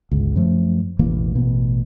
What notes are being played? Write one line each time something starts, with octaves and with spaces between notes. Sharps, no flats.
G1 C#2
F#2 F3 A3
E1 A1 E3 A#3
A1 B2